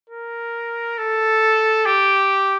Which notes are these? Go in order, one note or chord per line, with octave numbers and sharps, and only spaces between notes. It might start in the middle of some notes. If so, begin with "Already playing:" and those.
A#4
A4
G4